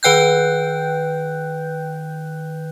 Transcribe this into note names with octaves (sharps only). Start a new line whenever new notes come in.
D#3 B4 G5 F#6 G6